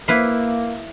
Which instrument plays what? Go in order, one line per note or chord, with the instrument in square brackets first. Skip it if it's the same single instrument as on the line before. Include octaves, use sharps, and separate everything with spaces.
[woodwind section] A#3 [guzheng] E4 B4 F5